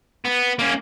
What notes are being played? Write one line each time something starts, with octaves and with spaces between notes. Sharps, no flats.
B3
A#3 C#4